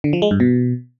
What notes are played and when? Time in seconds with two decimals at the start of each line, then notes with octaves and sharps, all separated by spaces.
0.04 D3
0.13 F3
0.22 G#3
0.31 G2
0.40 B2